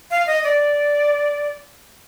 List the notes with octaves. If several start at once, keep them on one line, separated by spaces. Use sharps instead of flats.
F5
D#5
D5